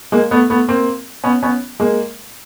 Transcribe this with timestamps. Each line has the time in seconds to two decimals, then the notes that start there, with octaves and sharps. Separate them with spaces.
0.12 G#3 A#3
0.31 A3 B3
0.50 A3 B3
0.68 A#3 C4
1.24 B3 C#4
1.43 B3 C#4
1.80 G#3 A#3